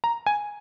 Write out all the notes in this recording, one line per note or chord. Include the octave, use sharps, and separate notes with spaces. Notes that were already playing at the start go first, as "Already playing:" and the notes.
A#5
G#5